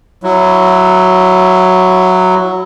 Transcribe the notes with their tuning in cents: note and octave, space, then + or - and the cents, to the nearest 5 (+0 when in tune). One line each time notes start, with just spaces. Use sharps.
F#3 +0 E4 +10